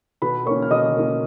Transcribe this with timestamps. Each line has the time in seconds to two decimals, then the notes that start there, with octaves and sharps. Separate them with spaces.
0.22 B2 B4 B5
0.46 A#3 C#5 C#6
0.51 C#4
0.62 F6
0.71 B2 D#5 D#6
0.96 A#3 C#4